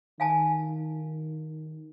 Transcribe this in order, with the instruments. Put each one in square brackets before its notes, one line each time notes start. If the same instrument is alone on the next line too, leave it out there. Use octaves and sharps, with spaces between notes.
[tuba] D#3 [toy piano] F5 G#5 A5